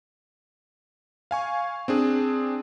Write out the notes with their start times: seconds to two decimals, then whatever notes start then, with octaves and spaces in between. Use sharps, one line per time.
1.31 F5 G#5 C#6
1.88 C4 D4 G#4